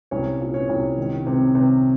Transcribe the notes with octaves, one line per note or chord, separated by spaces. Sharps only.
C2 C#4 C#5
A#2
C#4 C#5
C2
D#3
C3
C3